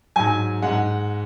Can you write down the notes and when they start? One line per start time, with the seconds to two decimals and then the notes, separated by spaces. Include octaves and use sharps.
0.16 G#2 F#3 G#5
0.62 G#2 G#3 F#5